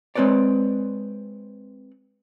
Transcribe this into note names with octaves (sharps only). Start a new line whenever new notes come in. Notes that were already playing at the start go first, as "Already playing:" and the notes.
G#3 C4 D#4 B4 C#5 D5